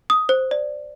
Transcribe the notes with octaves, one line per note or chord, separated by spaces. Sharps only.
D#6
C5
D5